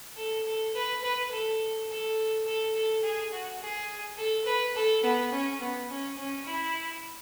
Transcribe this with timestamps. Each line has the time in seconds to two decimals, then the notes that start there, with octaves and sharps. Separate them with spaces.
0.17 A4
0.46 A4
0.74 B4
1.03 B4
1.31 A4
1.89 A4
2.46 A4
2.75 A4
3.03 G#4
3.32 F#4
3.61 G#4
4.18 A4
4.46 B4
4.75 A4
5.03 B3
5.32 C#4
5.60 B3
5.90 C#4
6.18 C#4
6.46 E4